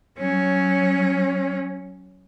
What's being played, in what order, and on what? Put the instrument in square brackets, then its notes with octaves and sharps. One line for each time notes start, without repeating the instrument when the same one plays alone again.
[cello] F#3 C#4